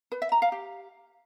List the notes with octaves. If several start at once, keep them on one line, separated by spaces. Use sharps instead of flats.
B4
E5
A#5
F5
G4